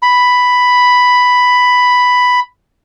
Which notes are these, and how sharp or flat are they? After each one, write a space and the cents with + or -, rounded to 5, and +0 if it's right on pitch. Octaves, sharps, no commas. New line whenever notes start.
B5 +5